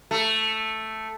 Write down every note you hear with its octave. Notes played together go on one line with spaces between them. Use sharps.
A3